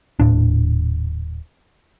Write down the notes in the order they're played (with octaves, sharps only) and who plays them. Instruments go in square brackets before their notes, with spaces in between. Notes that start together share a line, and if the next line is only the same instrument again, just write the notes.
[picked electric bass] D#1 A2 D4